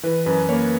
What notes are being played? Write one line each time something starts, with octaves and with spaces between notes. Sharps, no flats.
E3 B4
F#2 B4
A#3 C#5